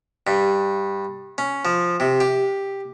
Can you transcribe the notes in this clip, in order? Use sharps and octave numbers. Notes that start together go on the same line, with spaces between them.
G2
C#4
F3
C3
G4